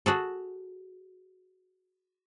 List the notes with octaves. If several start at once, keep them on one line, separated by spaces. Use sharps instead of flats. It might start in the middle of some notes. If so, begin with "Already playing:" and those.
F#4 G#4 A4